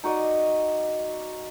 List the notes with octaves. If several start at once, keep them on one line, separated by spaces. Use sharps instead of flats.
D#4 F#4 D5 D#5